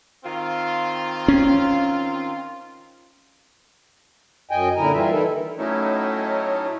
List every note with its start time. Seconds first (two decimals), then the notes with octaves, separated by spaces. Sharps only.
0.24 D#3 C4 F4
1.28 C#4
4.51 F#2 D#5 G5 G#5
4.77 A#2 D3 E4 A#4 G#5 A#5
4.93 E3 G3 F4 E5
5.11 E3 D#4 E4 A4 A#4
5.58 A2 F#3 A3 C#4 D#4 E4